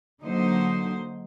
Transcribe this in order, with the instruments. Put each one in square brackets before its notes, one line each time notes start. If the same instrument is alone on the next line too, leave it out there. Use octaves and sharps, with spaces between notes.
[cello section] D3 F#3 A#3 D#4 C5